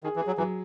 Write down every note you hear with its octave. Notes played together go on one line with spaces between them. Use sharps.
D#3 G#4
E3
G#4
F#3
E3 F#3